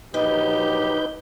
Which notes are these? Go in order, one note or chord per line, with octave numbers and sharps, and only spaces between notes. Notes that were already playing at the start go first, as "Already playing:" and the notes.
A#1 D#3 F#3 D#4 G4 B4 G6